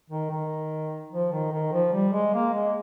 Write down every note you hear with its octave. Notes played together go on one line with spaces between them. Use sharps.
D#3
D#3
F3
D#3
D#3
F3
G3
G#3
A#3
G#3